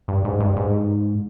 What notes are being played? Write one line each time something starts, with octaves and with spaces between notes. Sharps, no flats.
G2
G#2
G2
G#2